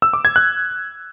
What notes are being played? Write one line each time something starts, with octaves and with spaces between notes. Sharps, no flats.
E6
D6
G#6
F#6